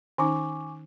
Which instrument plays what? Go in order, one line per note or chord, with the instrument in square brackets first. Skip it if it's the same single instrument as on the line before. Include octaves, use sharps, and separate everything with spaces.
[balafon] D#3 C#4 D#4 [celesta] G#5 C#6 D6